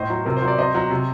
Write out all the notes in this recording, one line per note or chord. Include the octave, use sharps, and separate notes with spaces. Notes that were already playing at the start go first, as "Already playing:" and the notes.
Already playing: A2 C5 D#5
F#3
C3 A#4
C5
F#3
D5
C3 C5 D#5
F#3
C3